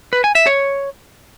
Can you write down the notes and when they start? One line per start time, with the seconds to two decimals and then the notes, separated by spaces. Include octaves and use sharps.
0.13 B4
0.24 G#5
0.35 E5
0.47 C#5